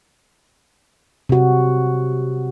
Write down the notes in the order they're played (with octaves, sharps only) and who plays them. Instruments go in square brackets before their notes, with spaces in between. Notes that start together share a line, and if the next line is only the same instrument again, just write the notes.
[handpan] C3 F#4